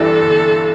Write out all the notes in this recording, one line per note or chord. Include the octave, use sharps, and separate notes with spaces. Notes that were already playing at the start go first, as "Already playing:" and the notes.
Already playing: G1 G2 E3 G3 E4 A4
G1